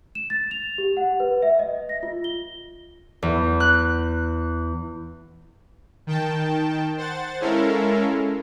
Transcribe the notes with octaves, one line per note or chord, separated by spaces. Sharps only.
E7
A6
F7
G4
F#5
B4
E5
D#5
A#6
F4
G7
E2
F#6
D#3 G5 A5
C5 F#5 A6
G#3 C#4 E4 A4 A#4 F5